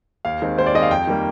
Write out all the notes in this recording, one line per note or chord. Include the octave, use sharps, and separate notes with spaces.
D#2 F5
D#3 G#3 C4
D#2 C5
D5
D#3 G#3 C4 D#5
F5
F2 G5
D#3 G3 A#3